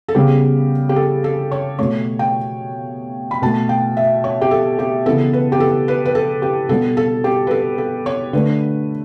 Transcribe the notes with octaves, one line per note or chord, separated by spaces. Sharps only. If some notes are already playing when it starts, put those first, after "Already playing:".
A4
C#3 G3 B3 G4
G4
A4
A4
C#5
B2 A3 C#5
G5
B5
B2 A3 A5
G5
E5
C#5
G4
A4
G4
C#3 E3 B3 A4
B4
G4
A4
B4
B4
A4
G4
B2 G3 B3 A4
A4
G4
B4
A4
A4
C#5
D3 A3 B4